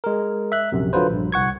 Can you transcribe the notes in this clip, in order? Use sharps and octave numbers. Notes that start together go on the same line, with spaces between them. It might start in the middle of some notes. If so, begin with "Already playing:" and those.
G#3 A#4
E5 F#6
A#1 F#2 C3
D3 F#3 F4 B4 C5
A#1 G2
C2 F#5 C#6 G#6